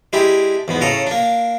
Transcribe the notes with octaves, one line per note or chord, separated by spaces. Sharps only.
G#3 D4 E4 G4
E2 G#2 B3
A2 C#3 A4 A#5
A#3 D4